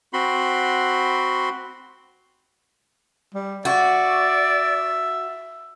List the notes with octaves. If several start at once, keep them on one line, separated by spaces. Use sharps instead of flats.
C4 F#4 B5 C6
G3
F#4 D5 E5